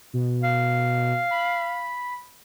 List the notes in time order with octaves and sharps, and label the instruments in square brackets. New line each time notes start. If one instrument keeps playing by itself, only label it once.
[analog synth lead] B2
[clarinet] F5
[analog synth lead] B5